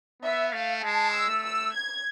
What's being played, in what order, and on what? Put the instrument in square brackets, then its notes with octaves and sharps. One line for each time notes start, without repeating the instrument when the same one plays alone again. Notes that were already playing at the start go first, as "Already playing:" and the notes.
[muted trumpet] B3 [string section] E5
[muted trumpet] A3 [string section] F5
[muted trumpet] G#3 [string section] A5
[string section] E6
[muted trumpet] A3
[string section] E6
G#6